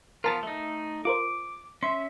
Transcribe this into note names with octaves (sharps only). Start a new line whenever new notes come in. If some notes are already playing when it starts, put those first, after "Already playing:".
F3 B3 F4 A#4 A5 A6
A3 D#4
F4 A#4 C5 D6
C#4 E5 C6